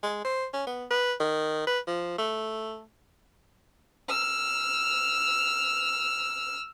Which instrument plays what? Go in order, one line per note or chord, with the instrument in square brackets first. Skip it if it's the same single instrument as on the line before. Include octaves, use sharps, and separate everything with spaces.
[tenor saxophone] G#3
C5
C#4
B3
B4
D#3
B4
F3
A3
[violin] E6 F6